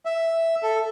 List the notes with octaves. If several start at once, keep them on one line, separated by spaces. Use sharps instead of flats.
E5
A4